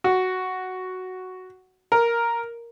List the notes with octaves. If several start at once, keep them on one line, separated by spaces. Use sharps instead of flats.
F#4
A#4